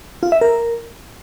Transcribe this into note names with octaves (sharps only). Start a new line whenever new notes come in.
F4
E5
A#4